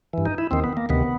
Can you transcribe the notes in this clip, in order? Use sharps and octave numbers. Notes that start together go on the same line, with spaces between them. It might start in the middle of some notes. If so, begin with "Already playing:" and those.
G2 E3
D#4
E4
D#2 D#3 C4
B3
A#3
D2 C3 D#3 B3